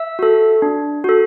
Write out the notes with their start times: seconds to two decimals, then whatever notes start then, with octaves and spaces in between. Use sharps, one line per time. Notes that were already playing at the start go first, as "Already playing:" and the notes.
Already playing: E5 E6
0.19 F#4 A4
0.62 D4
1.04 F#4 A4